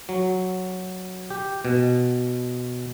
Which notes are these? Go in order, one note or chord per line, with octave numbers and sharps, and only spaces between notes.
F#3
G4
B2